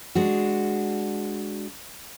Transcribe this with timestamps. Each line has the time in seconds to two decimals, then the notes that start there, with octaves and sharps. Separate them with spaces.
0.15 G#3 D4 F#4